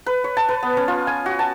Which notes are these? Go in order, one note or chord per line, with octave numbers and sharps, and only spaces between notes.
B4
C#5
A5
B4
B3
C#4
F4
G#5
F#4
A5